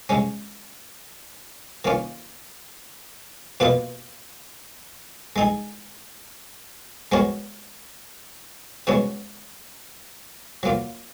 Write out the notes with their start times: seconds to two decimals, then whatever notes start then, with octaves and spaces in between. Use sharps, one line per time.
0.09 C#3 G#3 C#4
1.85 D#3 A#3 C#4 F4
3.60 B2 A#3 F4 B4 D#5
5.36 G#3 D#4 G#4
7.12 G#3 B3 F#4 A#4 C#5
8.87 C#3 G#3 B3 F#4 C#5
10.63 F#3 A#3 F4